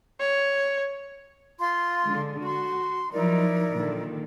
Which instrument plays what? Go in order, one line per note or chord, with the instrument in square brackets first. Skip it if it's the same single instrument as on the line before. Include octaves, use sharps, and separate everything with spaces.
[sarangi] C#5
[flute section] F4 C6
[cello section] D3 G#3
[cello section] F#4 [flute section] C6
[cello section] F3 F#3 D#4 [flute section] E4 A#4 D5
[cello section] A#2 D3 D#3